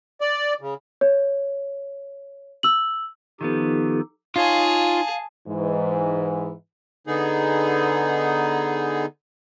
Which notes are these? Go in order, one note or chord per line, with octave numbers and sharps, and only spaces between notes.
D5
C#3
C#5
E6 F#7
D#3 F3 B3 D#4 G4 A4
D#4 F4 G#4 C#5 F5 A5
G#2 E3
D3 B3 D#4 G#4